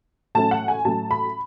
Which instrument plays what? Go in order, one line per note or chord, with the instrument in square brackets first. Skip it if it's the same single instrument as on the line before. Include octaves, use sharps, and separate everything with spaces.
[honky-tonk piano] A2 F#3 A3 C#4 A5
F#5
G#5
A2 F#3 A3 C#4 A5
B5